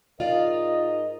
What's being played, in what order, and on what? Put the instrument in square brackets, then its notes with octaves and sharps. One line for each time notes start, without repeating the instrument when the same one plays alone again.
[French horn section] G#2 A#4 D#5 [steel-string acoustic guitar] F4 D5 F5